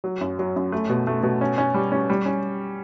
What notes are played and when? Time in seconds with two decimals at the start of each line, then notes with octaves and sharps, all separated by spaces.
0.04 F#3
0.21 F#2
0.39 F#3
0.56 F#2
0.72 A3
0.89 B2
1.07 A3
1.23 B2
1.41 C#4
1.58 C#4
1.74 G3
1.92 C#4
2.10 G3
2.26 C#4